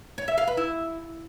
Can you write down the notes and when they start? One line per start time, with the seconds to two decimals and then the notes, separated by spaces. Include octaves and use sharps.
0.18 C#5
0.28 E5
0.38 F5
0.48 B4
0.57 E4